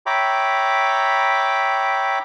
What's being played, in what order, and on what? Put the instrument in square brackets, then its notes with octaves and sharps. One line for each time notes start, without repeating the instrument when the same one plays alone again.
[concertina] C#5 E5 G5 A#5 B5 D6